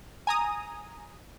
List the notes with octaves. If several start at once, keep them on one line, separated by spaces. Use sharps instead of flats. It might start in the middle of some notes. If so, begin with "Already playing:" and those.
G#5 A#5 D#6